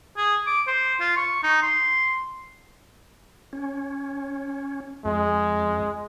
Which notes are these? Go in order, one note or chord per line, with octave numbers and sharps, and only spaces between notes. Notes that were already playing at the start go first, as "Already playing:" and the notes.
G#4
D6
C5
F4
C#6
D#4
C6
C#4
F2 G#3